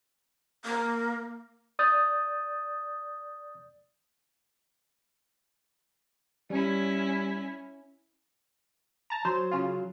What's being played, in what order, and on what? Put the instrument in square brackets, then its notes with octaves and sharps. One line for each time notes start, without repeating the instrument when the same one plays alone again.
[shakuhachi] A#3
[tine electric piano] D5 D#6 G6 A6
[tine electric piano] G3 [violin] C#4 E4
[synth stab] A5 A#5
[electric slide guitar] F#3 [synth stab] C5
[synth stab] C#3 F4